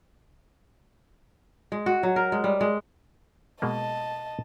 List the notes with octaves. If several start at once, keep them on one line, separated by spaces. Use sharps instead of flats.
G#3
F#4
F#3
A#4
G#3
G3
G#3
B2 G#3 A#3 D#5 A5